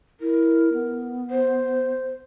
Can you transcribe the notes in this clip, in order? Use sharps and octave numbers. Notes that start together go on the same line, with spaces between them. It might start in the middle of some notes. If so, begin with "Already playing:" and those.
E4 A#4
B3
C5